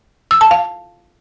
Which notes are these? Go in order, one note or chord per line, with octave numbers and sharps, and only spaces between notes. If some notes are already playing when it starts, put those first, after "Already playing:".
E6
A5
F5